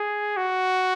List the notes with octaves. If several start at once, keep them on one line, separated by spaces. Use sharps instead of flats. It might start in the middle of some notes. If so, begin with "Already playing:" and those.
Already playing: G#4
F#4